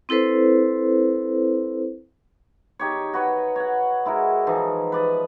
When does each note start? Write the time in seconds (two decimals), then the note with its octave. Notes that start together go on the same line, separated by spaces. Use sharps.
0.09 C4 E4 A4 B4 C5
2.79 D#4 G4 C#5
3.14 F#4 B4 C#5
3.56 C#5 F#5
4.05 G#3 E4 F#4 A#4
4.47 E3 F3 D#4
4.92 B4 D5 D#5